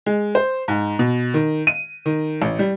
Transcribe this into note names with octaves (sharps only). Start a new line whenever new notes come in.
G#3
C5
G#2
B2
D#3
D#7
D#3
A1
G3